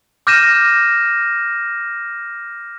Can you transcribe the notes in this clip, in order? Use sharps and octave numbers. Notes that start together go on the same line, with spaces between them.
D6 F6 G6 A#6 D#7 E7